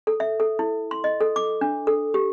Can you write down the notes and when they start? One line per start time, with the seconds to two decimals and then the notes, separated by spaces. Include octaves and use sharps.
0.07 A4
0.20 E5
0.40 A4
0.59 E4
0.91 C6
1.04 D#5
1.21 A4
1.36 D6
1.61 D4
1.87 A4
2.14 G4